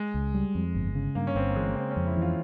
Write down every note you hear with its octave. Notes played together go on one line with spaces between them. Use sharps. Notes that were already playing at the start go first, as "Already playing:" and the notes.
Already playing: G#3
C#2
G3
F2
G1
C#3
G2 A#3
C#4
G1 C4
A#3
E3 G#3
A#3
C#3 C4
C#4
F2
E4
E3 F4